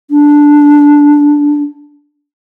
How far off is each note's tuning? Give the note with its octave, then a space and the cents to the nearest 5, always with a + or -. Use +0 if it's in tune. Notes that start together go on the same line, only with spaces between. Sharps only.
D4 -5